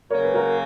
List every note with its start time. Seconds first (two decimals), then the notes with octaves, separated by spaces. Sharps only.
0.10 C#3 F#3 A#3 A#4 C#5
0.24 B4
0.34 F#4 A#4